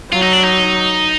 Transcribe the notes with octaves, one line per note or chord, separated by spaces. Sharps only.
F#3 F4
D#4
D4
D#4